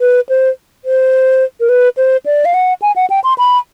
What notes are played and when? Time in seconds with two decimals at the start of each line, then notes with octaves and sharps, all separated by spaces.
0.01 B4
0.29 C5
0.85 C5
1.60 A#4
1.69 B4
1.97 C5
2.26 D5
2.45 F5
2.54 F#5
2.82 G#5
2.96 F#5
3.10 G5
3.24 C6
3.38 B5